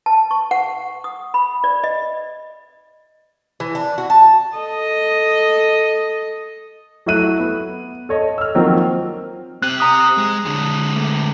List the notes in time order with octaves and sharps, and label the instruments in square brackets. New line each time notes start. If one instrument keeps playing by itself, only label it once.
[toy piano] A5
C#6
F#5
D#6
B5
D5
D#5
[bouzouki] E3
D4
F#4
A5
[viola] A4 D#5
[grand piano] F#3 A3 E4 F#4 F#6 D#7
B3
A4 C#5 D#5
E6 F6
D#3 F3 F#3 A#3 C4
[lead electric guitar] C4 G4 [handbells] F#6
[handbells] A#5 D#6 F#6
[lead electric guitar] G#3
D3 G#3
[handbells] A3